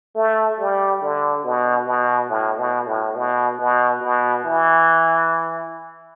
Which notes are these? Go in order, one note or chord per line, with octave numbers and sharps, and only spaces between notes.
A3
G3
D3
B2
B2
A2
B2
A2
B2
B2
B2
E3